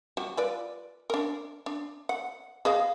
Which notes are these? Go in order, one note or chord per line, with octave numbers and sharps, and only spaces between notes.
G3 F#4
F4 B4 D5
D4 A#4
D4
F#5
G#4 D#5 F5